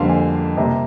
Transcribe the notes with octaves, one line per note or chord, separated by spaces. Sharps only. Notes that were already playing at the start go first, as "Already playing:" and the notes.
Already playing: F2 D3 G3 A#3 F5 C6
G#5
C3 G3 A#3 A#5